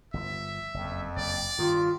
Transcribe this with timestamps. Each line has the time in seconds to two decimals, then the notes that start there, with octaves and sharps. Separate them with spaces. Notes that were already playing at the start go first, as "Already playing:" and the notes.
0.14 G1 F3 B3 E5
0.74 F#1 F2
1.16 F#1 D5
1.59 G2 D#3 F4